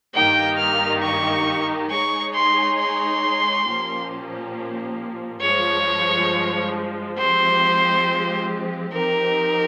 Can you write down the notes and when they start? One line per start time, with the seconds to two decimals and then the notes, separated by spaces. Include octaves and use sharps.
0.14 G2 D#3 A#3 D#4 G4 G5
0.58 F6
1.02 C#6
1.90 G#3 D#4 G#4 C#5 C#6
2.34 C6
2.79 C6
3.65 A#2 F3 A#3 C#4 G4
5.41 G2 F3 G#3 C#5
7.17 F3 G#3 C4 G4 C5
8.92 F3 C4 D#4 G4 A#4